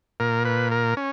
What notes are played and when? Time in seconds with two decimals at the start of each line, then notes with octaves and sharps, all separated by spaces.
0.20 A#2 A#4
0.45 B4
0.72 A#4
0.97 C#4